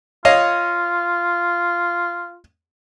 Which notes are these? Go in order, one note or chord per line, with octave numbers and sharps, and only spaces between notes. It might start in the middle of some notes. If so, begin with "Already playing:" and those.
F4 C#5 D#5 F5